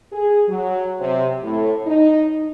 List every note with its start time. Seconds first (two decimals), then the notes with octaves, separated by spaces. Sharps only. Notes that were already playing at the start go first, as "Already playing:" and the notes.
0.12 G#4
0.49 F#3
1.00 C3
1.43 A2
1.86 D#4